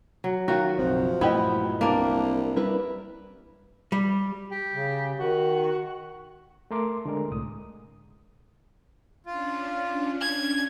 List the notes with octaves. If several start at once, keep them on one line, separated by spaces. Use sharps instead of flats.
F#3
D#3 F4 F#4
F#1 B1 F3 C4
G2 A#2 A3 B3 E4 G4 D#5
C2 A#3 C4 D4
G3 E4 A#4 B4
G3
G4
C#3
D#3 F#4
A3 A#4 C6 D6
D3 G#3 A#4
C2 A2 D#6
C#4 D4 F4
G#6